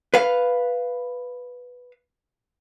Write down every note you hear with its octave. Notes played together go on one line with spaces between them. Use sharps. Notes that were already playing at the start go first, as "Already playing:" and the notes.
B4 F5